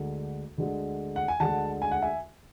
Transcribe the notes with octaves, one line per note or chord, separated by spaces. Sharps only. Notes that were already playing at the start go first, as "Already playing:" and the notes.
Already playing: D2 D3 G#3
D2 D3 G#3
F#5
G#5
D2 D3 G#3 F#5 A5
G#5
F#5
E5 G#5